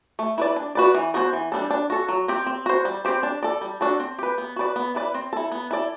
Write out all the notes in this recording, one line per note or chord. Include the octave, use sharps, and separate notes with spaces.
A3
E4 B4 D5
D4
F#4 B4 D5
E3
B3 F#4 A4 C5
E3
G3 D4 A4
D4
F#4 A4
F#3
C4 G4
C4
F#4 C5
G3
C4 G4 C5
D4
A4 D5
G3
D4 F#4 A4
C4
G4 B4
B3
F#4 B4 D5
B3
E4 B4 D5
C4
E4 A4
B3
E4 A4 D5